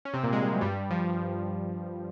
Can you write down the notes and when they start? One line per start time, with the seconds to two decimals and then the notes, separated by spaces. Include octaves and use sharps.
0.05 C#4
0.14 C3 C4
0.24 A#2 A#3
0.33 G#3
0.42 G3
0.53 F#3
0.61 G2 G3
0.90 F3